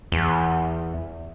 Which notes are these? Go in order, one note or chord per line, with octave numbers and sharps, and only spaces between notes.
E2